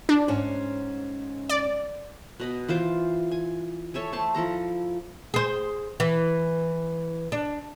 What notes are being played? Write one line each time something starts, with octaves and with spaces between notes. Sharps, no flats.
D4
G#2 C#4 C5
D5
B2 D#5 B5
E3 F4 C5 D6
G#5
A4 C#5 E5 G#5
A3 C5 A5
F3 E4 A4 A#5
G#4 C5
E3
D4